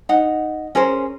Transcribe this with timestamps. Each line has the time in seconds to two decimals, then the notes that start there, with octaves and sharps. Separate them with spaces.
0.09 D#4 F#5
0.75 C#4 G#4 A#4 C5